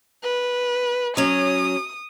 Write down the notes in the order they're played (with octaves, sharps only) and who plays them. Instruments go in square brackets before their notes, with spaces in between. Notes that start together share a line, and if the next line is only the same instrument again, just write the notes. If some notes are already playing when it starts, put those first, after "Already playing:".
[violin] B4
[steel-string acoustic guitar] F#3 C#4 [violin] D#6